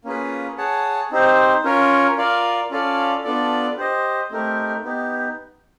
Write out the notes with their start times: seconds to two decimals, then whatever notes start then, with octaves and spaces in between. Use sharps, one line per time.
0.04 A#3 C#4 F4 G#4 B4
0.58 G#4 C#5 F#5 A5
1.11 C4 D#4 G4 C5
1.64 C#4 F4 A#4 C#5
2.18 F4 A#4 D5 F5
2.71 C#4 F4 A4 D5 F5
3.24 B3 D4 F4 A4 D5
3.78 G4 C5 D#5
4.31 A3 C4 D#4 G4 A#4
4.84 B3 D#4 G4